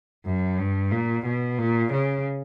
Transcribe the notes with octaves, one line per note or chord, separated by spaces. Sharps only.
F#2
G2
A#2
B2
A#2
C#3